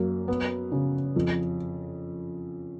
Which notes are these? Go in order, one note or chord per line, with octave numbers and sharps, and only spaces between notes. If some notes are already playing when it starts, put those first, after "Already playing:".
Already playing: F#2 A#3
B3
C#3
F2